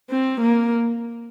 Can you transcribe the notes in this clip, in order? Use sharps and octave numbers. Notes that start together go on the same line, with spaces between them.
C4
A#3